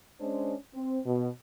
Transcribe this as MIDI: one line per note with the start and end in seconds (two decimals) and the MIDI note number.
0.20 0.54 56
0.20 0.54 61
0.20 0.54 62
0.20 0.54 72
0.74 0.99 60
1.06 1.28 47